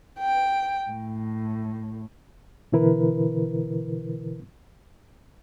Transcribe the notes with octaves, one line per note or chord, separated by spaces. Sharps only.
G5
A2
B2 D3 E3 E4 A#4 B4